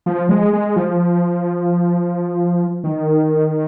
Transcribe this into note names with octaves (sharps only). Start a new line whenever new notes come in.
F3
G#3
G#3
F3
D#3